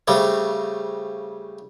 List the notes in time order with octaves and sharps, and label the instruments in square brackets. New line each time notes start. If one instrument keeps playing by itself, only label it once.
[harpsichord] C#3 G3 A3 C4